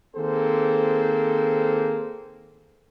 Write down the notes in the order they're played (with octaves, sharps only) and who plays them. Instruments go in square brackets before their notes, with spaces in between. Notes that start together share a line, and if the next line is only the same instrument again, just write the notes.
[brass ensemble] D#3 A#3 C4 G#4 A4 C5